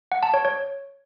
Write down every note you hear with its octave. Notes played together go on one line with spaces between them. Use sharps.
F#5
A5
C#5
C#5